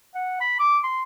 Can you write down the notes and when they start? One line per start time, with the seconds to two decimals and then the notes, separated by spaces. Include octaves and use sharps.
0.15 F#5
0.40 B5
0.59 D6
0.84 C6